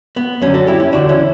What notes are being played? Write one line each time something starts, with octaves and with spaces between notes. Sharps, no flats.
B3
F#2 D3 C#4
F#4 A4
E4 G4
C#4 E4
E2 D3 D4 F#4
C#4 E4